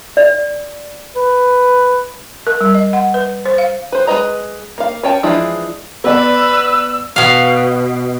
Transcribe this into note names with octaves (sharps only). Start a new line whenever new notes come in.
D5
B4
A#4
G3
D#5
F#5
B4
C5
F5
B4 C5
G#3 F#4 B4 D#5 A#5
A#3 F5
C#4 C#5 G5 A5
E3 F3 G#3 D4 E4
B3 B4 D5 E6
B2 F5